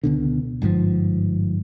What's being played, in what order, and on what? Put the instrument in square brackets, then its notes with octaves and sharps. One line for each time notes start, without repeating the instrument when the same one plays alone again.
[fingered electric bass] C#2 B2 D3
G1 G#2 C3 F3